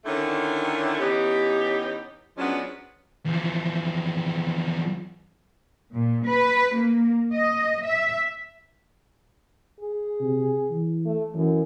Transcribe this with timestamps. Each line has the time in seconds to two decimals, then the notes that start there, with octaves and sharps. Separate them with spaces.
0.05 D3 D#3 A3 C#4 D4 E4
0.99 E3 B3 C#4 D#4 G4
2.37 F3 F#3 G#3 B3 C#4 D4
3.25 E2 F3
5.93 A#2
6.24 B4
6.74 A#3
7.32 D#5
7.84 E5
9.80 G#4
10.21 C3
10.71 E3
11.05 A3
11.35 F#2 E3